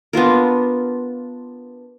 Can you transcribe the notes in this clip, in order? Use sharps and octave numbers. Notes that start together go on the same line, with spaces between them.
B3 D4 F4 A#4